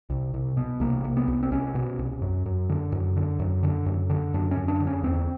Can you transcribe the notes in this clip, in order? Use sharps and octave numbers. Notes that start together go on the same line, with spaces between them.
C2
C2
B2
C2 A#3
C2
B3
C2
C4
C2 C#4
B2
C2
F#2
F#2
D3
F#2
D3
F#2
D3
F#2
D3
F#2 D4
C#4
F#2
D4
D3
C#4
E2 C4